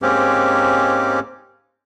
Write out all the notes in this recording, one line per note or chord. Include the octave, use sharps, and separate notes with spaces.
G#2 G#3 A#3 C4 C#4 G4